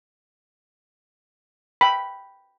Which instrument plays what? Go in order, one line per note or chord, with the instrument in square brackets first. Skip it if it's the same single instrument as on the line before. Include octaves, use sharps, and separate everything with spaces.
[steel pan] G5 B5